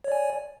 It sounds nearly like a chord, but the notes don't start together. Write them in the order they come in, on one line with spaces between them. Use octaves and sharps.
C#5 D5 G#5